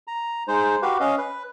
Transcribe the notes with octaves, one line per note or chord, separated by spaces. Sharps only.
A#5
G#3 D#4 C5
F#4 G4 B4 F5
C#4 D#5 F5
B4